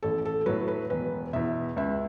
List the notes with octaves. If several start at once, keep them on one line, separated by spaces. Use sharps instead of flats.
A1 A4
A4
A2 F#3 B4
B4
E1 B4
E2 B2 E5
C#2 E5